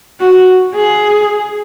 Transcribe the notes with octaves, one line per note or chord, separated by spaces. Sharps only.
F#4
G#4